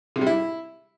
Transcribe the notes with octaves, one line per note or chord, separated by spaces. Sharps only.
C3
G3
E4